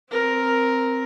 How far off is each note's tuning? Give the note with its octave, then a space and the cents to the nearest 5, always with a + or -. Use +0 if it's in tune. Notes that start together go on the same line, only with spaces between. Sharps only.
C4 +0 A#4 +5